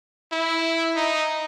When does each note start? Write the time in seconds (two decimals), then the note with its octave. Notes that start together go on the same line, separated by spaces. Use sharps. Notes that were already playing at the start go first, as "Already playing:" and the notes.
0.32 E4
0.96 D#4